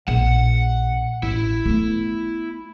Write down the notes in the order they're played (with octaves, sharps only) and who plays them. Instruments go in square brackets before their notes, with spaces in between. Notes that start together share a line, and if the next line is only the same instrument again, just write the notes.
[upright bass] A#1 [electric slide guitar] F#5
[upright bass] A1 [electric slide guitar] E4
[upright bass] A3 B3